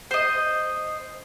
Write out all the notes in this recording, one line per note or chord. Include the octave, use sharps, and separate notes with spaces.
C5 D#5